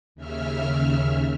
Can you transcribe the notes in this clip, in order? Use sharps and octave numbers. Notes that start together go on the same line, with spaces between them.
D#2 C#3 E5 F6